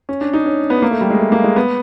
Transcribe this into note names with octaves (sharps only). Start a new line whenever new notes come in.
C#4
D4
D#4
C#4
B3
A#3
A3
G3
G#3
A3
A#3
G#3
B3